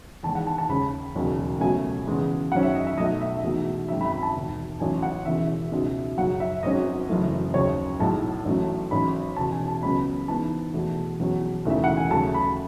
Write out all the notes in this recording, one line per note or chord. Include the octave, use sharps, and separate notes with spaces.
E2 D#3 G#3 A5
F#5
A5
A5
D#2 C#3 G#3 C#4 B5
E1 D#2 C#3 F#3
C#2 B2 F#3 A3 G#5
E2 C#3 G#3 B3
F#2 D#3 F#3 C#4 F#5
E5
D#5
E5
B1 B2 A3 D#4 D#5
E5
E2 B2 A3 D#4
G#1 F#2 D#3 G#3 E5
B5
B5
A5
E1 D#2 D#3
A1 A2 F#3 G#5
F#5
E1 E2 C#3 E3 E5
C#2 B2 G#3 D#4
F#2 C#3 F#3 F#5
E5
G#1 G#2 F#3 C#4 D#5
F#1 F#2 E3 A3
D#2 C#3 F#3 C#5
B1 A2 G#3 D#4 A5
A1 A2 F#3 A3 C#4
A1 G#2 F#3 B5
E1 E2 B2 A5
G#5
A5
C#2 C#3 F#3 B3 B5
G#2 E3 B3 D#4 A5
E2 B2 A3
E2 B2 F#3 C#4
E1 D#2 C#3 E3 A3 E5
F#5
G#5
D#2 C#3 F#3 A3 A5
B5